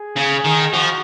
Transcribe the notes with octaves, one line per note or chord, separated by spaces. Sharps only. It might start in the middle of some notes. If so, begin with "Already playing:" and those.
Already playing: G#4
C#3
D#3
F3 F#4